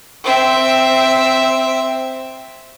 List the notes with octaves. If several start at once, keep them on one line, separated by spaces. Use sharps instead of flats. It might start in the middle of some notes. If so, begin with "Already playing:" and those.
C4 E5